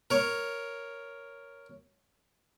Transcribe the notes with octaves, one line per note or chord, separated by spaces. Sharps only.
A#4 C#5